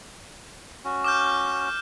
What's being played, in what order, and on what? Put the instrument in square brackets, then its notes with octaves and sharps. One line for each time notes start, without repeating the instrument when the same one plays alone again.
[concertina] C#4 F#4
[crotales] D6 F6 G6